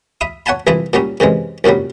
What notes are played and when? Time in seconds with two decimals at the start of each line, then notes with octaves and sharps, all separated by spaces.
0.21 E5 B5 D#6
0.46 C#5 F#5 G#5 A5 B5
0.67 C2 E3 F3 E4 E5 D#6
0.93 A#2 F#3 G3 C#4
1.20 F#2 C3 E3 G#3
1.64 C2 F#2 A#2 F#3 G3